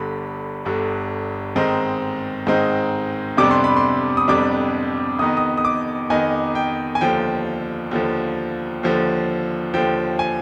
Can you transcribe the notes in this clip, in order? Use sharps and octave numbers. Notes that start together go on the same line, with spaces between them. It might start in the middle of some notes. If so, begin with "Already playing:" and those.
Already playing: G1 G2 D3 B5
G1 G2 D3
G#2 D#3 G#3 C4 D#4
G#2 D#3 G#3 C4 D#4
F2 C3 G3 B3 D4 D6
C6
B5
C6
D#6
F2 C3 G3 B3 D4 D6
F2 D#3 B3 D#4 D#6
D#6
D#6
D6
F2 D#3 B3 D#4 G#5
G5
G#5
D#2 D3 F3 G5
D#2 D3 F3
D#2 D3 F3
D#2 D3 F3 G5
G#5